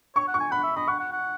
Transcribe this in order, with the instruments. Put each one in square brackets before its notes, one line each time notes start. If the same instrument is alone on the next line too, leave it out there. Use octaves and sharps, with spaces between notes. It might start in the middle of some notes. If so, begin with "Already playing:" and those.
[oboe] C#5 [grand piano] C#6
[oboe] F#5
[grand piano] C#6
[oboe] G#5
[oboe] F#5 [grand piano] B5
[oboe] E5
[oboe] D#5 [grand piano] B5
[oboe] F#5 [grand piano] C#6
[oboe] F#5
F#5